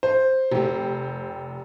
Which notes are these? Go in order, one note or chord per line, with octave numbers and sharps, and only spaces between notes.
C5
F1 G4